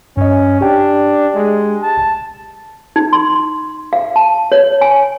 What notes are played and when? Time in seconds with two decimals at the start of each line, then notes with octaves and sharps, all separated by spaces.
0.17 G2 C#4 D#5
0.61 D4 G4 G5
1.35 G#3
1.82 A5
2.96 D#4
3.13 C6
3.93 F5
4.16 A5
4.52 C#5
4.81 G#5